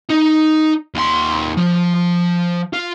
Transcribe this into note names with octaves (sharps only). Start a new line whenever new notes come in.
D#4
D#2 C6
F3
F4